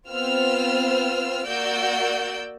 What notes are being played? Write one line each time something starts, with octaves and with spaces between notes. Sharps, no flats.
B3 C4 F4 C5 E6 F6
A#3 F#4 D5 E6 G6 D7